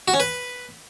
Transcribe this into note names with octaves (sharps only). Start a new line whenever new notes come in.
F#4
C#4
B4